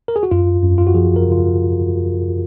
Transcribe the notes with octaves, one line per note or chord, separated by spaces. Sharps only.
A#4
G#4
F#4
F#2 F4
F#2
F4
F#4
F3 G#4
A#4
C#3
F4